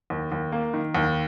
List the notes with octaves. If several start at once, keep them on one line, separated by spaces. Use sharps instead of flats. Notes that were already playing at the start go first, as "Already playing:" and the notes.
D#2
D#2
A#3
D#3
D#2